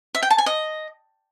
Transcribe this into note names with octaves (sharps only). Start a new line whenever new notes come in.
E5
G5
A5
G#5
D#5